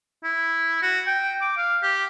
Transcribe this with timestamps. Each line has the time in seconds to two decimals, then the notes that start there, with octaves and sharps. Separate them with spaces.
0.23 E4
0.82 F#4
1.07 G5
1.41 D6
1.57 F5
1.83 G4